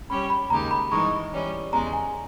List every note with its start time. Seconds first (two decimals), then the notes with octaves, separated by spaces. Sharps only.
0.10 G3 C#4 G4 C#5 B5
0.30 B5
0.50 D#2 C#3 G#3 D#4 G4 A#5
0.71 B5
0.91 G2 E3 G#3 D#4 A#4 C#6
1.32 E3 G3 C#4
1.72 E2 C#3 G#3 A#5
1.93 G#5